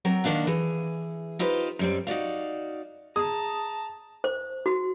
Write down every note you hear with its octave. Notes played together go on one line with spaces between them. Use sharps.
F#3 C4 A#4
D#3 A#3 C4 D4 F5 F#5
E3 G#4
D#4 F4 G4 B4 C5
F#2 G3 C4
D#4 F#4 D5 F5
G#4 A5 A#5 D#6
C5
F#4